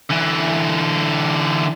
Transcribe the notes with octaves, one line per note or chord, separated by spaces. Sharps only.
D3 E3